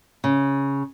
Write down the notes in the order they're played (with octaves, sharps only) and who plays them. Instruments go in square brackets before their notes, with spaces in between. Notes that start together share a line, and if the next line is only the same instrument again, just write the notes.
[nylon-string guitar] C#3